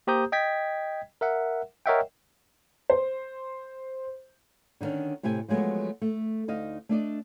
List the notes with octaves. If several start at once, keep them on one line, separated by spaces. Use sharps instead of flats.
A#3 G4 C5 A#5 D#6 G6
D#5 G5 G#6 B6
A#4 E5 F#5
A#4 C#5 D#5 E5 F#5 G5
C5
D3 D#3 A#3 C#4 D4
A2 C3 A3 G4 G#5
F3 F#3 G#3 A3 B3
A3
D2 D#4 D#5 F5
A3 D4 D5 D#5